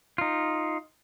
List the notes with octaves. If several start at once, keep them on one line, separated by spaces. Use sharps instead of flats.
D#4 F4